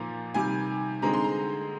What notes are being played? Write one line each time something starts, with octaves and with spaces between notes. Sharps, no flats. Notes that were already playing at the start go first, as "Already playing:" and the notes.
Already playing: A#2 F3 A#3 D#4 A#5
C3 D#3 G3 G#5
D3 G#3 C4 D#4 A#5
C6
A#5